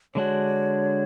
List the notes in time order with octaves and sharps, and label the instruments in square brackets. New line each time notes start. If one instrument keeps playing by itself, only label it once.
[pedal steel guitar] D3 G#3 D4 F#4 [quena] C#5